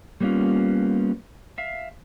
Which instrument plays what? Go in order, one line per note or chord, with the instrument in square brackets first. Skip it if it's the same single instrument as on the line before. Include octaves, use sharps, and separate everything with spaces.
[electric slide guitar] G3 A#3 B3 C#4 F4
E5 F5